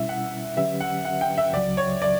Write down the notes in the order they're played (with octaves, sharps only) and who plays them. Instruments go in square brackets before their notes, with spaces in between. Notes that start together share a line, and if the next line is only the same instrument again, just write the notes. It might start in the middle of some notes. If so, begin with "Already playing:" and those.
Already playing: [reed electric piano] B2 G3 C#4 E4 [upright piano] E5
[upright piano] F#5
[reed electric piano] D3 F#3 C#4 G4 B4 [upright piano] E5
[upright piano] F#5
F#5
G5
E5
[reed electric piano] C#2 C#3 F#3 [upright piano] D5
[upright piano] C#5
D5